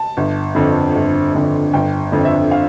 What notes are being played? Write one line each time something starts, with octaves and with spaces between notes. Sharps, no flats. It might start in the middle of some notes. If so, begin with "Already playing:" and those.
Already playing: A5
G1
F2 D3
G1
F2 D3
G1 G5
F2 D3
E5
F5